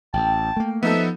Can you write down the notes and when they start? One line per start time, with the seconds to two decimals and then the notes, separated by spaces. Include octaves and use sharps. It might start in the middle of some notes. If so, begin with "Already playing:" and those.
0.13 A1 G5 A5
0.57 A3 A#3
0.83 F3 B3 D#4 A4 E5